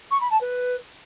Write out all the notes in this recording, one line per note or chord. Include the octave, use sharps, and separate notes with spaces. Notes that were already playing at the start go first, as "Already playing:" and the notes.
C#6
B5
A5
B4